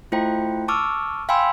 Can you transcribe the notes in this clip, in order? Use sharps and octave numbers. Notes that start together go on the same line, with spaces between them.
A3 E4 F4 C5 G5
A5 C#6 D6 E6 F6
F5 G5 G#5 B5 C6 E6